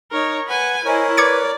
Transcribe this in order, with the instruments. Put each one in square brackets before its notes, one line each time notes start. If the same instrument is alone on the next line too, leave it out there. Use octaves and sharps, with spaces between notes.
[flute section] D#4 [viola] A#4 C#5
[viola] B4 G#5 [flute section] F#5
[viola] E4 [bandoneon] A#4 C#5 [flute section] C5 D#5 G#5
[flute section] B4 [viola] D5 [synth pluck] D6 G#6 C#7